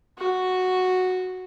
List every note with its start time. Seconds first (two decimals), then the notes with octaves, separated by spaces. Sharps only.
0.18 F#4